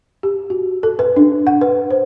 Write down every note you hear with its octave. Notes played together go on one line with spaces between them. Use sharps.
G4
F#4
A4
B4
D4
F#5
B4
C5